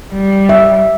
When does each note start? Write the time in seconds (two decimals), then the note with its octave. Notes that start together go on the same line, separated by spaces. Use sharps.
0.14 G3
0.49 E5